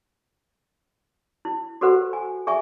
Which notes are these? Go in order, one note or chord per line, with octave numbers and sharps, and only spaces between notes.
E4
F#4 G4 A4 B4 C5 F#5
G#5
G#4 E5 G#5 C#6